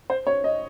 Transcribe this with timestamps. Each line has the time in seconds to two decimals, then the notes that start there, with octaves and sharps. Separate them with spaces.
0.10 C5
0.27 C#5
0.44 D#5